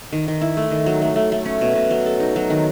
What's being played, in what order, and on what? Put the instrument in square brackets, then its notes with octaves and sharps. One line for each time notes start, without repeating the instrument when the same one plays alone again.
[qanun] D#3
D#3
E4
A3
D#3
F#3
A3
A3
A3
C#4
B2
B2
F#3
A4
D#4
F#3
D#3